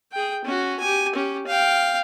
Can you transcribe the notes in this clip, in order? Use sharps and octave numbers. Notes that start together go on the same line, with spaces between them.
G#4 G5
C#4 F#4
G4 G#5
C#4 G4
F5 G5